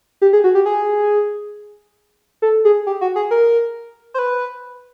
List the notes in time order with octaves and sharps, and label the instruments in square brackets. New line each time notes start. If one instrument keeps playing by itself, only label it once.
[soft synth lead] G4
G#4
F#4
G4
G#4
A4
G#4
G4
F#4
G#4
A#4
C5
B4